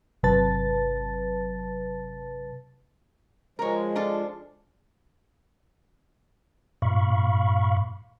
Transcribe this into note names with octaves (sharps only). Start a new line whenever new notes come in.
G1 C3 F#3 B4 A5 A6
F3 G#3 A#4 C#5
D4 F4 A4
G2 A#2 F5 B5 C#6